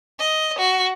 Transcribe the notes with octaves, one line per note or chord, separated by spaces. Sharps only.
D#5
F#4